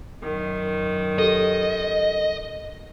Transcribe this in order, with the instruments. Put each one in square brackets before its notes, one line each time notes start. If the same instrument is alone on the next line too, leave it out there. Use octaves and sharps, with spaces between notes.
[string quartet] F#2 D#3
[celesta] G4 A4 [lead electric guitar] D#5